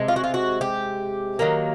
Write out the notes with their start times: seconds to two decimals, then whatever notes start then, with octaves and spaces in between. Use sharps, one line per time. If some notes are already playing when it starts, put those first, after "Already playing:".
Already playing: C3 G#3
0.08 F4
0.16 F#4
0.24 F4
0.34 F#4
0.61 G4
1.39 D#3 F#3 A#3